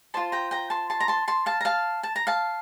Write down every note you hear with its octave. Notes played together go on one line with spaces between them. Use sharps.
F4 C5 A5 C6
G5 A#5
G5 A#5
A5 C6
A5 C6
A#5
A5 C6
A5 C6
F5 A5
A#5
F5 A5
A5
A#5
F5 A5